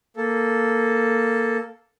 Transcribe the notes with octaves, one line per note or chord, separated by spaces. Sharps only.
A#3 A4